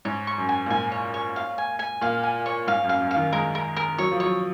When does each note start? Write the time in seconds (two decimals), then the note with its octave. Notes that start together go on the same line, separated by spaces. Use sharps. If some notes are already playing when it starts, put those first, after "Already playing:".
0.05 G#2 C#5
0.27 C#6
0.38 F#2
0.49 G#5
0.66 A#2
0.70 G#2 G#5
0.92 C#5
1.14 C#5
1.36 F5
1.58 G#5
1.79 G#5
2.01 A#2 F5
2.23 G#5
2.46 C#5
2.67 G#2 F5
2.84 F#2
2.89 F5
3.00 F#2
3.11 F5
3.16 D#3
3.33 G#3 A#4
3.55 A#4
3.77 A#4
3.98 F#3 C#5
4.11 F3
4.20 F#3 C#5